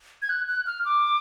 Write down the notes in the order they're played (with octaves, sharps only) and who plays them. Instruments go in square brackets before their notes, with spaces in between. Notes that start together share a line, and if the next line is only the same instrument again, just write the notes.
[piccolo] G#6
F#6
F#6
F6
D6